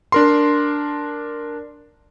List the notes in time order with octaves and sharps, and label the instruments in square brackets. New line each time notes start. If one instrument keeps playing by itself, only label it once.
[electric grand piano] D4 A#4 C6